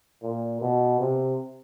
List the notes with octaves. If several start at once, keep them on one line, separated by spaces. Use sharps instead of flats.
A#2
B2
C3